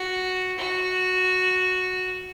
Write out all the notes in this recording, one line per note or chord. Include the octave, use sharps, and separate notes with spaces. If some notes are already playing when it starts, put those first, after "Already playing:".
Already playing: F#4
F#4